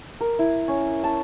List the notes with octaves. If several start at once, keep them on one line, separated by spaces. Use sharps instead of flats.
A#4
E4
C#4
A5